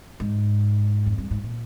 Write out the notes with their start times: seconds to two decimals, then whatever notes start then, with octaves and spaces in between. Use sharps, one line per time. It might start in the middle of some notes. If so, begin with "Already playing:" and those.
0.20 G#2
1.06 F2
1.18 G2
1.31 G#2
1.43 A#2